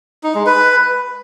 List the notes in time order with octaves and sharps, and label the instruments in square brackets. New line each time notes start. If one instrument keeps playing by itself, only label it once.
[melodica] D#4
G#3
B4